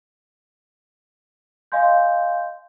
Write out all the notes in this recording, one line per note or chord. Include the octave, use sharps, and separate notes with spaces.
D#5 F5 G#5 C6 G6